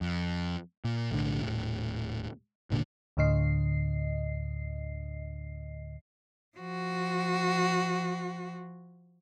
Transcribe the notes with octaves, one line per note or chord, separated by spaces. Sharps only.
F2
A#2
B1 A2 D3
D#1 G#1 A2
G#1 D#2 A#2 D3
D2 A2 D3 D#5 C7
F3 F#4